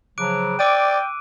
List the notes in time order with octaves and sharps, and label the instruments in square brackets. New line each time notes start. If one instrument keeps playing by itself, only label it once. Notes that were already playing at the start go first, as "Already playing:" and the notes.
[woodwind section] C#3 F3 F#3 [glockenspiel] D6 F#6 D7
[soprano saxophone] D5 [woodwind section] G5 [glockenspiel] D6 E6 D#7